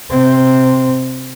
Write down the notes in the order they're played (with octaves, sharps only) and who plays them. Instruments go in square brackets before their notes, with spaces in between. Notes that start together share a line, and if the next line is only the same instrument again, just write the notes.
[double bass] C3 C4